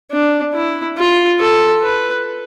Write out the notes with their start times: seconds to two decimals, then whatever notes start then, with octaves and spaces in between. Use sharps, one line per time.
0.12 D4
0.54 E4
0.98 F4
1.40 A4
1.83 B4